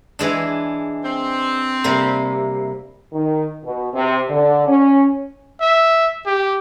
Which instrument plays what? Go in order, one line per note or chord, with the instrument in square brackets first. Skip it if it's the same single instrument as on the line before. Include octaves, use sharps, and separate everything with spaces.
[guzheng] E3 G#3 D4
[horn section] C4
[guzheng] C3 G3 A#3
[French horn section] D#3
B2
C3
D3
C#4
[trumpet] E5
G4